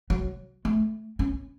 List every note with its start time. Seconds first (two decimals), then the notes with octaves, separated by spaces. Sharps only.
0.10 F#3
0.65 A3
1.19 C#4